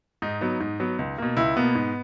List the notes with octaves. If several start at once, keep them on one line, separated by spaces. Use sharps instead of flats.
G#2 D#4
F#3 B3
G#2
F#3 B3
C#2
B2 A#3
C#2 E4
B2 A#3 B3
G#2